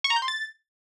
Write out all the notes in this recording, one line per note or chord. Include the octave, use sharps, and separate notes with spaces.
C#6
A#5
G6
C6
A6